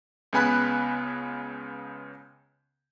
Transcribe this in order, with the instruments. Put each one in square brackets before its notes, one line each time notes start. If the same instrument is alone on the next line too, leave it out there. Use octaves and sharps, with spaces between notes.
[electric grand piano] C#2 C#3 B3 G#5 B5 F#6